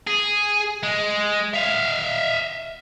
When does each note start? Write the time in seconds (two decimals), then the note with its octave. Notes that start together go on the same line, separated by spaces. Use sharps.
0.07 G#4
0.83 G#3
1.54 E5 F5